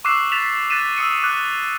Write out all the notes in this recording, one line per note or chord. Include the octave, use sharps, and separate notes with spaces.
C#6 D6 E6 F#6 C7 E7
F#6 A6 B6 E7 F7
F#6 A6 B6 D#7 E7
D#6 E6 C#7 D#7
D6 F#6